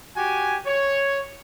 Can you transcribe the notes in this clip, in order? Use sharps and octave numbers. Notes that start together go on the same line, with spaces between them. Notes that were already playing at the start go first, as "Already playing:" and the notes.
F#4 G4 G#5
C#5